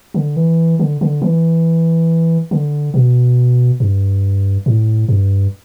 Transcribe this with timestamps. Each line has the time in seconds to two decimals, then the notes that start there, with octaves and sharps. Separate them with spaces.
0.14 D3
0.36 E3
0.79 D3
1.01 D3
1.22 E3
2.51 D3
2.94 B2
3.80 G2
4.66 A2
5.09 G2